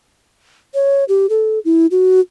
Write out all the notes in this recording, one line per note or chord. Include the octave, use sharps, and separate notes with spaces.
C#5
G4
A4
E4
F#4